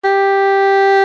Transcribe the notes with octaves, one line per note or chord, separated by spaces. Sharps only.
G4